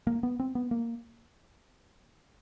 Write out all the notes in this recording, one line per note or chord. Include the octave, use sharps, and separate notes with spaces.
A#3
B3
C4
B3
A#3